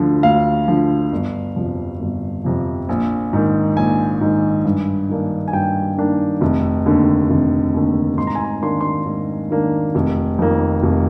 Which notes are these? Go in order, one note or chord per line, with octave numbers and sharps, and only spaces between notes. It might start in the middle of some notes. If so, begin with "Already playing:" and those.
Already playing: D2 D3 F3
D2 F5
D3 F3
G1
F2 C3 F3
G1
F2 C3 F3
A#1
G#2 D#3
A#1 G#5
G#2 D#3
G2
D#3 A#3 D4
G#5
G2 G5
D#3 A#3 D4
F1
D#2 D3
F1
D#2 D3
G#2 C6
A#5
G#5
A#5
D#3 A#3 D4 C6
C6
G#2
D#3 A#3 D4
F1
F2 D#3 A#3
F1